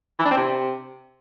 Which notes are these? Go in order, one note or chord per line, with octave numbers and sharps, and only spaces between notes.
E3
D4
C4
C3